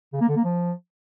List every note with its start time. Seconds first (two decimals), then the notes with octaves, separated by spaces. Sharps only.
0.13 C#3
0.21 A#3
0.29 D3
0.36 A#3
0.44 F3